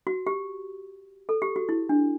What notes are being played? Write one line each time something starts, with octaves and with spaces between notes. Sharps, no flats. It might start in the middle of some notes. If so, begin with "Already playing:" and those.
F#4
G4
A4
G4
F#4
E4
D4